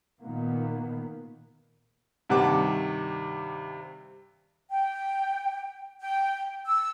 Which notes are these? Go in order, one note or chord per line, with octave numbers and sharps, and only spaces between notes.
A#2 D#3 A#3 B3
G2 C3 D#3 F#5 A5 D6
G5
G5
E6